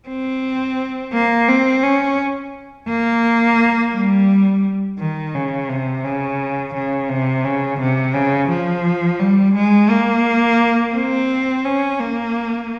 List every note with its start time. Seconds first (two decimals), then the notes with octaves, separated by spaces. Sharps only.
0.08 C4
1.13 A#3
1.49 C4
1.83 C#4
2.89 A#3
3.94 G3
4.99 D#3
5.34 C#3
5.69 C3
6.04 C#3
6.74 C#3
7.09 C3
7.44 C#3
7.80 C3
8.14 C#3
8.49 F3
9.20 G3
9.55 G#3
9.90 A#3
10.94 C4
11.65 C#4
12.00 A#3